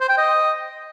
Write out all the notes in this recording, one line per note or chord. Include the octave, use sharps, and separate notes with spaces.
C5
G5
D#5